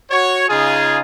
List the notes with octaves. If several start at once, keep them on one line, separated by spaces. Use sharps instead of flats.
F#4 C#5
C#3 D#4 F4 G#4